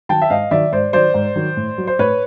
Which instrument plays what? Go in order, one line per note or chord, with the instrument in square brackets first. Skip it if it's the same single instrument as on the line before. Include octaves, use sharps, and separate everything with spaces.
[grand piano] D#3 F#3 G5 A5
E5
G#2 D#5 F5
D#3 F#3 D5 E5
G#2 C5 D5
D#3 F#3 C5 D5
G#2
D#3 F#3
A2
F#3
C5
A2 B4 C#5